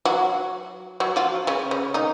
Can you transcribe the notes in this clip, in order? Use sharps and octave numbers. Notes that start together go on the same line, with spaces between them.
F#3 F#4
F#3 F#4
F3 F4
C#3 C#4
C#3 C#4
D#3 D#4